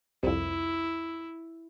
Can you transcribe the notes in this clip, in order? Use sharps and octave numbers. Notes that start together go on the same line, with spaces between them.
C2 F2 E4